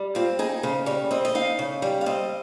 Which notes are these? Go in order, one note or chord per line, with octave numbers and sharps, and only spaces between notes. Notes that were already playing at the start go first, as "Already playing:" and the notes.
Already playing: G3
C4 F4
D#4 G#4
C#3 C5
G3 C#5
C4 D#5
D#5
D#4 F5
C#3
G3
F5
C4 D#5